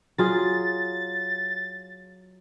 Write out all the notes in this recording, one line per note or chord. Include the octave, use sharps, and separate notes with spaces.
F#3 F4 G#4 A6